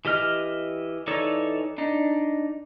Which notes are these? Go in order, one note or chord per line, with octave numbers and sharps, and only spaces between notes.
E3 G4 D#5 F6
E3 D#4 A4 C#5 D5
D4 D#4